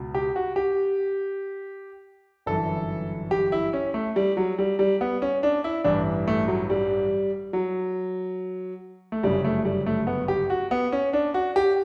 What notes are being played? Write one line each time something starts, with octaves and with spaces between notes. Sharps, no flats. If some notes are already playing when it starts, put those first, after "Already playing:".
Already playing: C#2 B2
G4
F#4
G4
G1 F#2 E3 A4
G4
E4
C#4
A3
G3
F#3
G3
G3
B3
C#4
D4
E4
A1 G2 E3 D4
A3
F#3
G3
F#3
A3
G1 F#2 C#3 G3
A3
G3
A3
B3
G4
F#4
B3
C#4
D4
F#4
G4